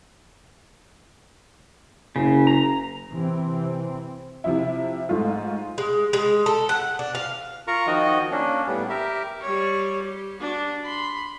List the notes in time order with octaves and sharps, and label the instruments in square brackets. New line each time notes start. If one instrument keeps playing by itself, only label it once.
[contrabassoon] F#1 [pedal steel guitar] C#3
[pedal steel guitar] A#5
[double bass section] C3 E3 C4
[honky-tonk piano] C3 F3 E4
G#2 A3 F4
[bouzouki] G#3
G#3
A4
F#5
D4
F5
[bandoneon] F4 A#4 A#5 C#6
D#3 F3 D#4 F#4 D#5
A#3 C#4 D4
A2 G3 B3
G4 A#4 E5
[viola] G3 C#5
G4
D4 F#4
B5 C6